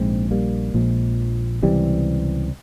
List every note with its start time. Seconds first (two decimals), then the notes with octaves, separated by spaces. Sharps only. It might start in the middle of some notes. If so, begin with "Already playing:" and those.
Already playing: A#1 G#2 G#3 C4
0.31 G3 A#3
0.74 A#1 A#2 F3 G#3
1.63 C#2 C3 E3 G3